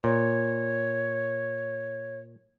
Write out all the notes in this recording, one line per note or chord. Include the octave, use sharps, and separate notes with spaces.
A#2 C#5